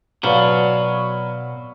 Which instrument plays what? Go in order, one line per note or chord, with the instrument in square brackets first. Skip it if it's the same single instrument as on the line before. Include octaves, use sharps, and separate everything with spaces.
[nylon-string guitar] B2 D5 [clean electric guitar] F#3 [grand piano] B4 [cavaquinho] F5